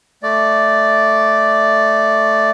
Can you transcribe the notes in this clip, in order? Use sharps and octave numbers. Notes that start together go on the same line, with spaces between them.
A3 D5